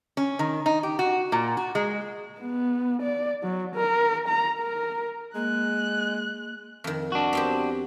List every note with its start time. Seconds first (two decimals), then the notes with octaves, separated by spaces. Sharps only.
0.17 C#4
0.39 D#3
0.66 D#4
0.83 G4
0.99 F#4
1.32 A#2
1.57 F#4
1.75 G#3
2.40 B3
3.02 D5
3.43 F#3
3.75 A#4
4.28 A#5
4.59 A#4
5.35 G#3 A#3 F#6
6.84 F2 D#3
7.12 D4 F#4
7.33 B3 C4 G4